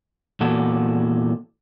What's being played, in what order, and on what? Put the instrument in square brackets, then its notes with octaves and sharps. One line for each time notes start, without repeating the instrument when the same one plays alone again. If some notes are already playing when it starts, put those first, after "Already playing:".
[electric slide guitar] E2 A#2 F#4 A4